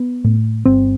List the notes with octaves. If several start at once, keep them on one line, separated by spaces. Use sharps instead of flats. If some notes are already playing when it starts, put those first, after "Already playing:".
Already playing: B3
A2
G1 C4